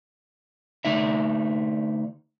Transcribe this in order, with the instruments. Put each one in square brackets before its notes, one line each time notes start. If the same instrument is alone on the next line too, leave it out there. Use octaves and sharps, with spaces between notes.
[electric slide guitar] D3 A3 D#4 E5